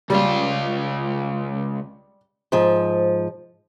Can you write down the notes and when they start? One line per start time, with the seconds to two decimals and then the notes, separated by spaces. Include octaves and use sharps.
0.10 C#2 G3 F4
2.52 G#2 F3